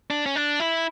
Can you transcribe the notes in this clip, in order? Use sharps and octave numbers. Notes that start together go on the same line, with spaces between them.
D4
C#4
D4
E4